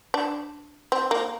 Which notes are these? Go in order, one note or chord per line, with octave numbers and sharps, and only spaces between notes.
D4
C4
A#3